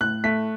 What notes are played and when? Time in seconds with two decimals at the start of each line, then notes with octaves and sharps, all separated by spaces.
0.01 A2 F#6
0.24 A3 B6